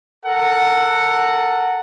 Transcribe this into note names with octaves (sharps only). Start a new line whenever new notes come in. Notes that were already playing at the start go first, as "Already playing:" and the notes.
A4 A#4 F#5